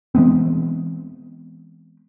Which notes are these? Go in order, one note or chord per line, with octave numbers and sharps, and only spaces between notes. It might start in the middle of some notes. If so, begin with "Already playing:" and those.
E3 G#3 B3 C4